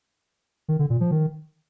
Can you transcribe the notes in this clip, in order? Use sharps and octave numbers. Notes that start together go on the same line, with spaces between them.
D#3
D3
A#2
F3
D#3